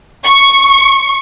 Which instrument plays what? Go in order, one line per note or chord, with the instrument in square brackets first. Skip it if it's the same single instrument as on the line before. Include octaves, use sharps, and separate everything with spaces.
[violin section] C#6